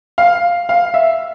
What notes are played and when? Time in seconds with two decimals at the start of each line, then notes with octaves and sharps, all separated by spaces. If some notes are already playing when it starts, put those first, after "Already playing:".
0.18 F5
0.69 F5
0.94 E5